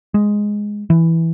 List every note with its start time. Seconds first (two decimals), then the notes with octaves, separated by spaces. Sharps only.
0.14 G#3
0.90 E3